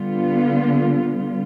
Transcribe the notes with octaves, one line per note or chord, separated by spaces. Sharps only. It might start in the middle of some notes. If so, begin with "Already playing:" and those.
Already playing: D3 G3 B3 F4